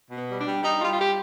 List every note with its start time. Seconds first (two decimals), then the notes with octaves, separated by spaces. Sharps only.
0.11 B2
0.17 B3
0.29 G3
0.40 D4
0.46 G3
0.63 G3 D#4
0.81 G3 F4
0.91 F4
0.99 G4